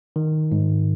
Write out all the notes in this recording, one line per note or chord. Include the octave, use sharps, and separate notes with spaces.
D#3
G#2